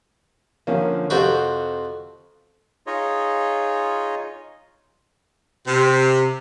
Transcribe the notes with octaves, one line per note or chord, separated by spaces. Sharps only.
D3 D#3 F3 A#3 C#4
F2 C3 F#4 C5 F5 G5
D#4 F4 G#4 C#5 D#5
C3